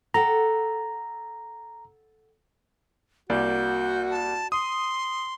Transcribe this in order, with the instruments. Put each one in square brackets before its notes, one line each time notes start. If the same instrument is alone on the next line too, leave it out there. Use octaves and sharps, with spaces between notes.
[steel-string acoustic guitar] A4 F#5 G5 [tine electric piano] A#5
[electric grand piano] C2 A#3 D5 [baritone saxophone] F#4 [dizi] G6
[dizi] A5
[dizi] C6 [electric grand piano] D#6